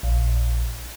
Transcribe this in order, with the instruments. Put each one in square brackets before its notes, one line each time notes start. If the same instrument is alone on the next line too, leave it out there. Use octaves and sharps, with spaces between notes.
[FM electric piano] A#1